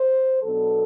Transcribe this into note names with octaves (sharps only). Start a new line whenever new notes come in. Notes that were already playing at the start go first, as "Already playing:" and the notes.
Already playing: C5
B2 F#3 B3 D4 A4